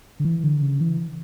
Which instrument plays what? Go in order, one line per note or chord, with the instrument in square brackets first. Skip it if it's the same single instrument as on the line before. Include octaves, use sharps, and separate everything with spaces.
[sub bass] D3
E3
D3
C#3
E3